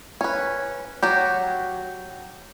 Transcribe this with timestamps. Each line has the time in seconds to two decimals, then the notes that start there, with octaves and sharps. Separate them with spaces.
0.21 C#4 B4
1.03 F#3 F#4 G4